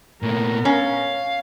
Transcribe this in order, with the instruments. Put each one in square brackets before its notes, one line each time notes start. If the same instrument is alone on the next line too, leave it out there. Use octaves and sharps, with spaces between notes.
[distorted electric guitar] A#2 A3 [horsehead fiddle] B3 A#4
[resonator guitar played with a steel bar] C#4 [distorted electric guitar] F5